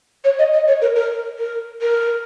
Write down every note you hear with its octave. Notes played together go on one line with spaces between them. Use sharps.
C#5
D#5
D#5
C#5
A#4
A#4
A#4
A#4